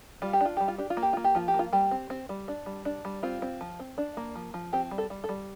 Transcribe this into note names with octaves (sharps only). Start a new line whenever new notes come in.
G3 F4
G4
D4 F4
G3 G4
F4
D4 G4
F4
A#3
G4
A#3 F4
G4
F3 F4
G4
A#3
F4
G3 G4
C4
C4
G3
D4
G3
D4
G3
C4 F4
C4
F3
C4
D4
A#3
F3
F3
C4 G4
G3
A4
G3
A4
G3